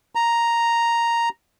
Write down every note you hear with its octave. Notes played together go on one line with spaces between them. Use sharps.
A#5